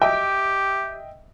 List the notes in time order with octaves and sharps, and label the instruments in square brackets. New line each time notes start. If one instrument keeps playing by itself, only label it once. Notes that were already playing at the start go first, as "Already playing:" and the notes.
[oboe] G4 [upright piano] D#5 E5 G5